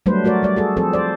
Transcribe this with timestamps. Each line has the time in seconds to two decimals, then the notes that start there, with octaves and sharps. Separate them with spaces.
0.06 F#3 G3 A3 D4 B4 C5
0.24 A3 F#4 A#4 D5
0.43 G3 D5
0.56 F#4 G#4 A4
0.77 F3 C4 G#4 A4 C5
0.93 C5 D5